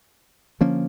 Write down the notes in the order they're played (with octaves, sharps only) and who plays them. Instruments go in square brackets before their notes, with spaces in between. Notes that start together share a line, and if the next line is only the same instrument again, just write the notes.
[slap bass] D3 F3 A#3 C#4